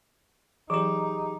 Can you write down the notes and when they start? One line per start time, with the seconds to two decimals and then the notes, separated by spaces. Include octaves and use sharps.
0.70 E3 F#3 D#4 G4 G#4 D6